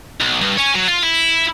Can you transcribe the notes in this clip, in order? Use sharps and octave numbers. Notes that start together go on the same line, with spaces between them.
B1
G2
C#5 G#5
F#3
F4
E4